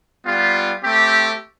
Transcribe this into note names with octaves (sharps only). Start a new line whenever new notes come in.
G3 B3 F4
A3 C4 G4